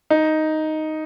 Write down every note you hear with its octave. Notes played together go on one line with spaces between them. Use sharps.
D#4